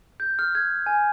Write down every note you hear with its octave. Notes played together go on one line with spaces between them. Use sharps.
G6
F6
G#6
G#5